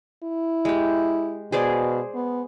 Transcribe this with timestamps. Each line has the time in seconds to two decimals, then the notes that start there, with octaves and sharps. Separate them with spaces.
0.23 E4
0.65 G#3 G4
1.52 B2 G#4 C5 D5
2.15 B3